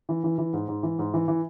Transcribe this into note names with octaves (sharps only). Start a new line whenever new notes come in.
E3
E3
E3
G#2
G#2
E3
G#2
E3
E3